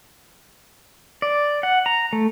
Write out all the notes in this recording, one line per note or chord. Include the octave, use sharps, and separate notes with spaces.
D5
F#5
A#5
A3